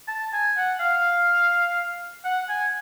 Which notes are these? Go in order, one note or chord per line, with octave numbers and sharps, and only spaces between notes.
A5
G#5
F#5
F5
F#5
G#5